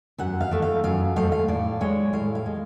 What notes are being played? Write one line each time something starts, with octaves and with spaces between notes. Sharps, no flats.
F#2 F#5
F5
F3 A3
F5
F#2 F5
F3 A3 F5
F5
A2 D5
G#3 C#5
A2 F5
F5
G#3